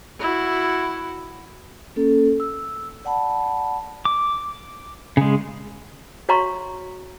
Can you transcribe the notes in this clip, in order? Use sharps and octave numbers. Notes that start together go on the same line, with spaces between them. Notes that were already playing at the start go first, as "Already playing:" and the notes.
E4 F#4
A#3 C#4 A4
E6
D5 F#5 A5 B5
D6
C#3 G#3
F#4 C#5 F5 A#5 C6 C#6